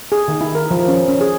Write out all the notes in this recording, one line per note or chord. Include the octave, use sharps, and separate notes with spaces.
G#4
D#3
E4
A#4
F3
C#4
C#4
G#4